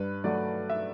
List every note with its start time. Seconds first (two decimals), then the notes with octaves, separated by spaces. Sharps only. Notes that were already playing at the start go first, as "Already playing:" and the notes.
Already playing: G2 B4
0.24 F#3 A3 D5
0.70 E5